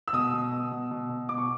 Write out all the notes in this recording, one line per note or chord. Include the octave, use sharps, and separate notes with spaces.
E6
B2 D#6
B2
B2
B2
B2
B2
B2 D6
C#6